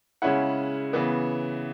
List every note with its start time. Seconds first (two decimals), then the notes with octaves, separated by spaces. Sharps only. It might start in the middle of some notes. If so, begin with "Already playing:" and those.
0.22 C#3 G#3 C#4 E4 F#5
0.93 C#3 E3 B3